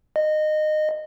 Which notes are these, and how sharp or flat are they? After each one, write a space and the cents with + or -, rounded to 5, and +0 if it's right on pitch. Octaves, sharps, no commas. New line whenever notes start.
D#5 -20